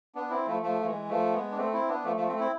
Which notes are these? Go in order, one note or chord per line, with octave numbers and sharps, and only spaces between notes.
B3 D4
C4 E4
F3 A3
F3 A3
F3
E3 G#3
F3 A3
G#3 B3
D4
A3 C4
C4 E4
B3 D4
F3 A3
F3 A3
A3 C4
C4 E4